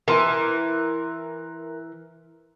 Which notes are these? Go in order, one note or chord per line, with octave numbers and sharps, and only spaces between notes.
E3 A#4 C6